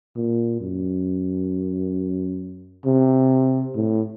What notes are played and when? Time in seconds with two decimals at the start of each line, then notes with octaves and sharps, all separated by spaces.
0.16 A#2
0.61 F#2
2.85 C3
3.75 A2